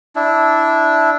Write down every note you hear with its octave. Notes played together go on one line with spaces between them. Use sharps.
D4 E4